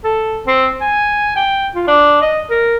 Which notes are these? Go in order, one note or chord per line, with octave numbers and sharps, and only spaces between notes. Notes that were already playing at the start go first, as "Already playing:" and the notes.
A4
C4
G#5
G5
F4
D4
D#5
A#4